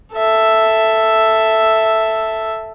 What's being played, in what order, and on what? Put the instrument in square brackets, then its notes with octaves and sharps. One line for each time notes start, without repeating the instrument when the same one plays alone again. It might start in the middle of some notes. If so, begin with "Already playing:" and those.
[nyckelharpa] A4 E5